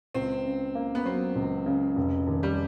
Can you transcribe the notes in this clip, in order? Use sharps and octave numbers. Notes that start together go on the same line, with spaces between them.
C#2 C4
C#3
A#3
B3
F#3 C4
C#2
C#3
F1
D#2
G3